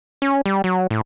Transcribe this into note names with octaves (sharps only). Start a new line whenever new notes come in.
C#4
G3
F#3
A2